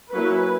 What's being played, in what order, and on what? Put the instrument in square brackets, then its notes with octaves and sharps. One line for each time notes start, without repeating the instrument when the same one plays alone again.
[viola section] F#3 A#3 C#4 E4 B4